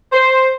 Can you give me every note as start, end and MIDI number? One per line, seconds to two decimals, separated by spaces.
0.11 0.51 72